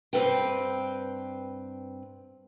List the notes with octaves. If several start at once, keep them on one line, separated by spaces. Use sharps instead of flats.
G2 C4 A#4 B4 G5